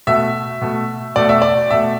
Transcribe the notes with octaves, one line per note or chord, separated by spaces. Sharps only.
B2 A3 E5
B2 A3
B2 A3 D5
E5
D5
B2 A3 E5